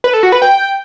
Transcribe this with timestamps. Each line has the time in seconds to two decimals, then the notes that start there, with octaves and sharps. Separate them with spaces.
0.04 B4
0.13 A4
0.23 F#4
0.32 B4
0.42 G5